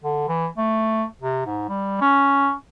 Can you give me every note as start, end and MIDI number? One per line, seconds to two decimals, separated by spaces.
0.04 0.28 50
0.29 0.47 52
0.57 1.04 57
1.22 1.42 48
1.46 1.67 44
1.69 2.00 55
2.01 2.53 61